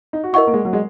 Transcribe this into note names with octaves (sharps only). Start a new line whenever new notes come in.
D#4
F#4
E4 A#4 D#5 F#5 C#6
A#3
G#3
F#3
G#3